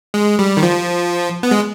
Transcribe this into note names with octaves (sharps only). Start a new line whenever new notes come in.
G#3
G3
D#3
F3
B3
G#3